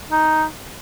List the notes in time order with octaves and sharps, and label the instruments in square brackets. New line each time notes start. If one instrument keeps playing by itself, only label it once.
[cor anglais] D#4